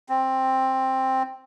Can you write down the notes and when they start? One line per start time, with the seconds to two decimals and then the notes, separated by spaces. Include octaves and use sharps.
0.09 C4